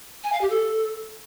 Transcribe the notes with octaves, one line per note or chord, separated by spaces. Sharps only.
G#5
F5
G4
A4